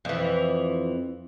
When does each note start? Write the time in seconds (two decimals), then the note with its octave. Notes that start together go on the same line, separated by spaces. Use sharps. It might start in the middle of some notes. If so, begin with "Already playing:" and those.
0.05 F2 E3